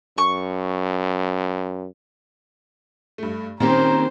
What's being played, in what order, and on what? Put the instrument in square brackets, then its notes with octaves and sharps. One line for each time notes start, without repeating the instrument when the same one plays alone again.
[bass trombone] F#2 [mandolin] C#6
[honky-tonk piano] G2 A3
[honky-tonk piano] A#2 [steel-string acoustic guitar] D#3 C4 G4 [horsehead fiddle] C#4 C5 [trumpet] A#5